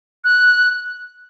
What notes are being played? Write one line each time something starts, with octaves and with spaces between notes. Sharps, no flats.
F#6